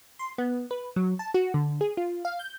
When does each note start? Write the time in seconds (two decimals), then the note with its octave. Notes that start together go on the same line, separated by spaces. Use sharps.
0.19 C6
0.38 B3
0.71 B4
0.96 F#3
1.19 A5
1.34 F#4
1.54 D3
1.81 G#4
1.97 F4
2.25 F5
2.39 G6